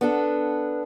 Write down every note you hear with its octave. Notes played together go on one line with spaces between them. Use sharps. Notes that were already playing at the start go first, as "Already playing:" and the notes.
B3 D4 A4